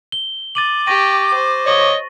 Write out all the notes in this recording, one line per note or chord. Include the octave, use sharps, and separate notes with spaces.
G7
D6 A6 D#7 F#7
G4 C#6 A#6 D#7
C5
C#5 D#5